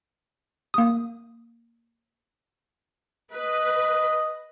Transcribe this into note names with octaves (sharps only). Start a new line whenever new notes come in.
A#3 D#6
B4 D#5